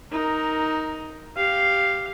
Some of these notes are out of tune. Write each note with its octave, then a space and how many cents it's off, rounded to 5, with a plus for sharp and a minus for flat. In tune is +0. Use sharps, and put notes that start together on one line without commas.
D#4 +10 A#4 +0
G4 +0 F5 +0